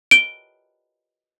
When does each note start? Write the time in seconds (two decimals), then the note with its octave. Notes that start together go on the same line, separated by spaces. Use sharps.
0.11 D7 G7